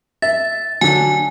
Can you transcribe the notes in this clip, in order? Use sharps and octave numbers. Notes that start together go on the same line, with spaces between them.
E5 A6
D3 F#3 G#5